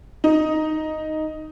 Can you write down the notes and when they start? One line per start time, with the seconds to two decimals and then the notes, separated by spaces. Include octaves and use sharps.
0.24 D#4